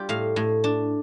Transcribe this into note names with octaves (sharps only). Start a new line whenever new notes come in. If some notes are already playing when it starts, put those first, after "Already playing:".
Already playing: G3 F4 G4
A2 F5
A2
D4